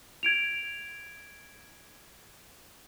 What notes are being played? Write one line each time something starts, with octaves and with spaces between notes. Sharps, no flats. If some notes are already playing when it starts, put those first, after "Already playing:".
G#6 D7 F7